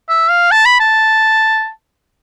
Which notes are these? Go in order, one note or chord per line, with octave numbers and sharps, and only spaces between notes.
E5
F5
A5
B5
A5